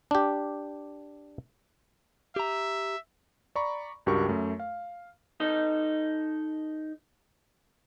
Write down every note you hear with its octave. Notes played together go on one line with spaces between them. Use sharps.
D4 G4
G4 E5 A#5
D5 A#5 B5 C#6
C#2 G2 F#4 G4 A#4 C#6
F#2 A3
F5
D#4 A4 D#5